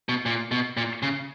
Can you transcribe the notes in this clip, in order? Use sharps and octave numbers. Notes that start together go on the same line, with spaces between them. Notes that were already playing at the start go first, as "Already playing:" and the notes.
B2
A#2
B2
A#2
C#3